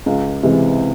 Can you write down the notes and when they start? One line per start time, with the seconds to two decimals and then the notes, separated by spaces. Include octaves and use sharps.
0.06 C#2
0.43 C3 E3 G#3